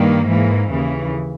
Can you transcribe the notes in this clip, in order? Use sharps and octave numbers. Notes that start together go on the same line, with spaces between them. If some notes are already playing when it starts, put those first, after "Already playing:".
Already playing: G2 D#3 A#3
G#2 E3 A#3
D#2 C#3 E3